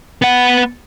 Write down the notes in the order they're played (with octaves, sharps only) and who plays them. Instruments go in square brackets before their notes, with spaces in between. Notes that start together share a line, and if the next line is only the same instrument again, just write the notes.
[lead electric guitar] B3 F#5